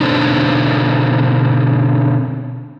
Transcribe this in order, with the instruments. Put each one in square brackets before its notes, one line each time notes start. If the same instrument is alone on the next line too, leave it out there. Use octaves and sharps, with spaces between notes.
[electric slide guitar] B2 D3 C4 D4 D#4